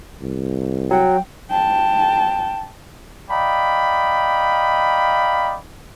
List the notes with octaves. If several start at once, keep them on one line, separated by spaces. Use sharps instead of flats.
C2
F#3 F#5 G5
G5 A5
D5 D#5 F5 G5 A#5 B5